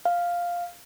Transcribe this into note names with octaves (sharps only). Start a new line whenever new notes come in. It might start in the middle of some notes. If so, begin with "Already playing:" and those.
F5